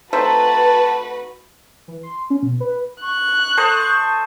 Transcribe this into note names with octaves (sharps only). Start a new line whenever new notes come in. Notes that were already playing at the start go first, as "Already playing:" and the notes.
A3 C4 D#4 F#4 B4 A5
E3
C6
C#4
B2
B4
C#6 F#6
A4 C5 D#5